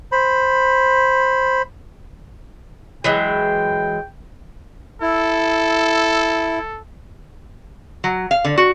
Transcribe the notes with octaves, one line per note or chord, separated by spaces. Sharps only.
C5 B5
E3 F#3 G#3 G5
E4 A4
F#3
F5
D3
F#4